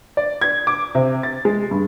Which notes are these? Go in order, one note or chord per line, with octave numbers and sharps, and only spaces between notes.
D5
G#6
D6
C3
A6
G#3
G2